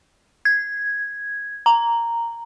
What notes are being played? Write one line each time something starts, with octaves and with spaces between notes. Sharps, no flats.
G#6
A#5